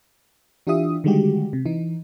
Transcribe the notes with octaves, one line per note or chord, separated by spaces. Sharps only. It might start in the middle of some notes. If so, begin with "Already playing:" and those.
E3 D4 F4 G4 E5 D#6
D3 D#3 G3 G#3 F#4 G4
C3
E3 D#4